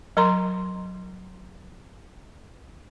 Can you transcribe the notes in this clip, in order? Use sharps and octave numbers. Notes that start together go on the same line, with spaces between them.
F#3 A#4 A#5 C6